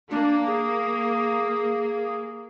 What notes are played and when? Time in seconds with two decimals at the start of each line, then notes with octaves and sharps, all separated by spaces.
0.11 A#3 D4
0.47 G#4